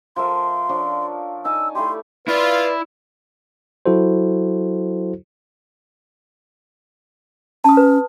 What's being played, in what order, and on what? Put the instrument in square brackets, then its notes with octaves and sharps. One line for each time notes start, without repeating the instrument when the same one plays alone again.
[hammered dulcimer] F3 A#4 E5 [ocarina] C6
[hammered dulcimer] F3 D4 C#5
[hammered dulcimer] D#4 G#5 A5 [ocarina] E6
[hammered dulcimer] A3 E4 G4 [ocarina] C6
[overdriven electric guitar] E4 [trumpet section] F4 [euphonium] B4 [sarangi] D5
[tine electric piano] F#3 E4 F#4 A4 C5
[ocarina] C#4 [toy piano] A5 D#6
[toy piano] B4